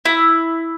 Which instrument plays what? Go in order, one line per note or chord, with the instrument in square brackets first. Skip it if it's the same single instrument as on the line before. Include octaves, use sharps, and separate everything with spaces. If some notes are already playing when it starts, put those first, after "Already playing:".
[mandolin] E4